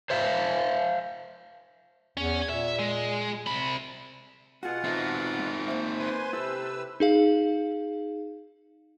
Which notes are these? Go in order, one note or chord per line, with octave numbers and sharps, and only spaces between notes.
C5 E5 F5
E2 C#4
A#2 E5
G#3
C3 B5
B2 F4 F#4 G#4 F#5
F2 C4 D#4 A4 E5
A3
A#3 C5 E5
B4 G#5 C6
C3 E4 A4 B4 E6
D#4 G#4 F5